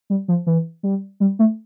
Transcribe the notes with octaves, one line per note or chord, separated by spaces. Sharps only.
G3
F3
E3
G3
G3
A3